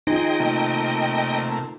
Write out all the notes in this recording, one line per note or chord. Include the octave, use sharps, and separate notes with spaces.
D#4 F4 G#4 C5 D#5 G5 A#5
C3 A3 A#3